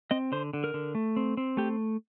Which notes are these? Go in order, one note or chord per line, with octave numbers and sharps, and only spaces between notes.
C4 D#5
D3 C5
D3
A#4
D3
A3
C4
C4
A3 G4